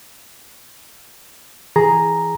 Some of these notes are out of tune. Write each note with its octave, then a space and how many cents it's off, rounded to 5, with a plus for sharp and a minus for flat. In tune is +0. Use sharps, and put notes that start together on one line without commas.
E3 +0 G#4 +0 A#5 +0